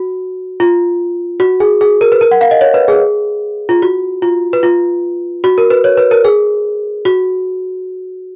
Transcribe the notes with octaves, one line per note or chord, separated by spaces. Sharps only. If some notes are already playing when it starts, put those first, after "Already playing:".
Already playing: F#4
F4
F#4
G#4
G#4
A#4
B4
A#4
F#5
F5
D#5
C#5
B4
G#4
F4
F#4
F4
B4
F4
F#4
A#4
B4
C#5
B4
A#4
G#4
F#4